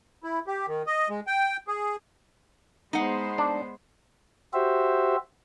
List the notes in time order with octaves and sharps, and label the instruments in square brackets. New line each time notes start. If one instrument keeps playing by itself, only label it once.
[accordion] E4
G4
D#3
D#5
G#3
G5
G#4
[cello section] G#3 B3 C5 [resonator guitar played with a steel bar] D#4 F#5
[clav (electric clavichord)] D4
[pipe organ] F#4 G4 C5 E5